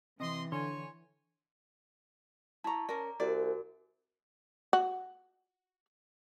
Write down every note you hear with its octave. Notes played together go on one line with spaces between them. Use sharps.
C3 E3 D#5 C6
D3 C#5 G#5 C6
E4 A5 A#5 C#6
C#4 A#4 D5 A#5
C2 F#4 A#4 D5
F#4